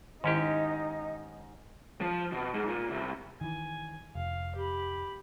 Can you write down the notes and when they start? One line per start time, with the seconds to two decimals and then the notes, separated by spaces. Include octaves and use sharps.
0.24 G#2 D#3 C#4 D#4 E4 G4 D#5
2.01 F3
2.32 B2
2.54 G#2
2.68 A#2
2.91 C2
3.41 D#3 E3 G#5
4.15 F1 F5
4.55 G4 B5